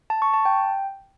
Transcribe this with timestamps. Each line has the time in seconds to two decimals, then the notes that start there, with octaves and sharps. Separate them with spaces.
0.10 A5
0.22 C#6
0.34 A5
0.45 G5